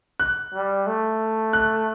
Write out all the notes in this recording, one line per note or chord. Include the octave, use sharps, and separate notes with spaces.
F#6
G3
A3
F#6